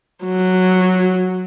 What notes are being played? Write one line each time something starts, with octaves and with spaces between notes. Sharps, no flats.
F#3